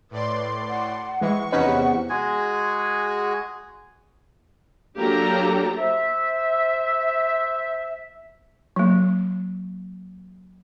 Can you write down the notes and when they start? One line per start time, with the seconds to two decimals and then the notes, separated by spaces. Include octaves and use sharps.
0.11 A2 B4 D5 C6
0.68 F#5
1.21 E3 G#3 C#6
1.52 E2 C3 C#4 D#4 B4 F#5
2.10 G#3 F#4 G#4 G#5
4.98 F#3 A#3 D4 G4 A4 A#5
5.78 C5 E5
8.76 F#3 A#3